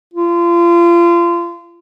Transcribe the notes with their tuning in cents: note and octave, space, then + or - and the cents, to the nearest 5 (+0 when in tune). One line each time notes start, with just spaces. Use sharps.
F4 -30